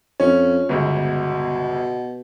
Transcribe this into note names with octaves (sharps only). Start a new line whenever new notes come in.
F2 C#4
G1 C#2 B2